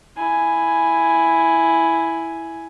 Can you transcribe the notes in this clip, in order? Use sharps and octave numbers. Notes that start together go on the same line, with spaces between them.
E4 G#5